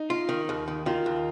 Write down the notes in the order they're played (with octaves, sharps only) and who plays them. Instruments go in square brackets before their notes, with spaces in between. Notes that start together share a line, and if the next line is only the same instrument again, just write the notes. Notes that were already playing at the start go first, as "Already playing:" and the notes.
Already playing: [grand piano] D#4
[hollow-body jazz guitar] F4
D#3
D#2
D#3
[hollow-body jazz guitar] D#3 [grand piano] F4
[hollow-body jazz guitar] D#2